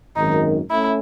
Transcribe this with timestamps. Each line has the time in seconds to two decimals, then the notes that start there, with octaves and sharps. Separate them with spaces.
0.16 G#1 F#2 D#3 D#4
0.70 A3 C#4 E4